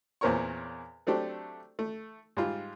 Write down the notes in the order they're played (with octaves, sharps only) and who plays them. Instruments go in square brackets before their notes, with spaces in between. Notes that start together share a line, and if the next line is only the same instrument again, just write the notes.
[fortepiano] E2 A#2 C4 A#4 C#5 C#6
F#3 A3 C4 D4 G4 A4
A3
G#2 G3 F4